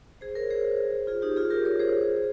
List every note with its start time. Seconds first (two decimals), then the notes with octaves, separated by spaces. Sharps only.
0.21 G#4 C5
0.35 A#4 C#5
0.50 G#4 C5
1.07 F4 G#4
1.22 D#4 G4
1.36 F4 G#4
1.50 G4 A#4
1.65 A#4 C#5
1.79 G#4 C5